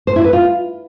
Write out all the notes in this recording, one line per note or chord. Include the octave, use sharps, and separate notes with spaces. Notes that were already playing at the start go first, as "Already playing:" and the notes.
C5
E4
B4
F4